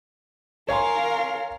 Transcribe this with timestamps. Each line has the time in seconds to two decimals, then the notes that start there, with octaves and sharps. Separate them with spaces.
0.69 A#4 C#5 F5 G#5 C6